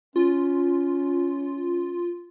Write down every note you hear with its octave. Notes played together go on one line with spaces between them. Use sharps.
C#4 F4